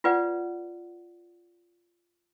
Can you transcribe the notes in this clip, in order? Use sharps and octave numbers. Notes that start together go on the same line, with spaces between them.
F4 B4 D5 F#5